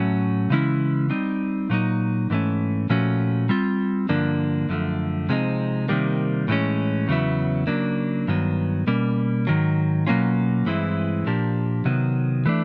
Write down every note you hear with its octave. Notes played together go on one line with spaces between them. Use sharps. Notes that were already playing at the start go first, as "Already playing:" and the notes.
Already playing: A2 F#3 A3 C#4 F#4
C#3 E3 G#3 C#4 E4
G3 C4 D#4
A#2 F#3 A#3 D#4
G#2 E3 A3 C#4
A#2 F3 A3 C#4 F#4
G3 C4 F4
G2 D3 F3 A#3 D4
F#2 D3 F3 A3
C3 F3 G#3 C4 D#4
C3 D#3 G3 A#3
A2 E3 G#3 C#4
E2 C#3 F#3 B3 E4
C#3 F#3 A#3 D4
G2 D#3 F#3 B3
B2 G3 A#3 C#4
G#2 D#3 F#3
B2 F#3 A#3 C#4 F4
G2 E3 G#3 C4 E4
A#2 F3 A#3 D4 G4
C3 D#3 F#3 B3
E3 A3 D4